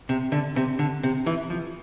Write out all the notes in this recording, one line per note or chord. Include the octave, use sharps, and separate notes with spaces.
C3
D3
C3
D3
C3
E3
F3